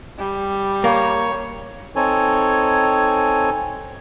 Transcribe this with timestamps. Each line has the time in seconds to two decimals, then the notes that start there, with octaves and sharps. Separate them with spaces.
0.18 G3
0.84 A#3 C#5
1.96 C4 D#4 A4 C#5 G#5